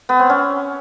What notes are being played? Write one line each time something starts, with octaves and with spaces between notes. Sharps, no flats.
B3
C4
C#4